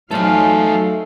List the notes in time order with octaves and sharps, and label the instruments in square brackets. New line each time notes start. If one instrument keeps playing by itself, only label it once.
[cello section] F#3 D#4 F5 [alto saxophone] A3 [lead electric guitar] A4 C5 [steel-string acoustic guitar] G#5 A#5